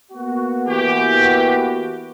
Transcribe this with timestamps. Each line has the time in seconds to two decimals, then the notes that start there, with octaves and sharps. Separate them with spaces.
0.12 A#3 B3 F#4
0.68 E3 G4